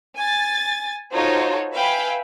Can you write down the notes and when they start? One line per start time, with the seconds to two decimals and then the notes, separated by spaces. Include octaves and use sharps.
0.17 G#5 A6
1.13 D#4 F4 F#4 A4 C5 C#5
1.73 B4 E5 F5 G5 G#5 B5